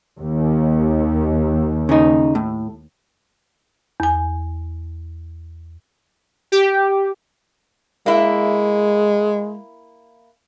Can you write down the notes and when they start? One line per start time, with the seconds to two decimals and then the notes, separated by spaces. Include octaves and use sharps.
0.20 D#2
1.89 C#3 D#4
2.35 A2
4.00 E2 G#5
6.52 G4
8.06 G#3 A#3 E4